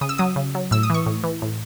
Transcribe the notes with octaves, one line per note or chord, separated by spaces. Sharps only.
C#3 D#6
E6
F#3 D#6
C#3
F#3
A2 E6
D#6
E3 C#6
A2
E3
A2